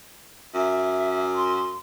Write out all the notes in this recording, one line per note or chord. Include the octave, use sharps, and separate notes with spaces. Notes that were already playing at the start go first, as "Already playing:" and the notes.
F#2 E5
C6